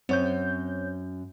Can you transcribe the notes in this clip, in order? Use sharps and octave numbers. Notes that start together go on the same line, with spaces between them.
F#2 C4 C#5 G6